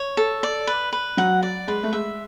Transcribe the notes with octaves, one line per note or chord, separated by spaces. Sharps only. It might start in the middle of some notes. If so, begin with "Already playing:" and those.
Already playing: C#5
A4
D5
B4
B4
F#3 F#5
D5
G#3 B4
A3
G#3 E5